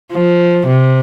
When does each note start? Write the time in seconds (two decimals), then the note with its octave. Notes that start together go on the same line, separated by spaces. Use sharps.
0.12 F3
0.67 C3